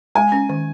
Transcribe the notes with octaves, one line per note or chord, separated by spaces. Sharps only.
G#3 G#5
C#4
D#3